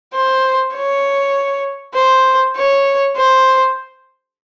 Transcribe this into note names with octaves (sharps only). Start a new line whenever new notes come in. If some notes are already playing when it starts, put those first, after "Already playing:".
C5
C#5
C5
C#5
C5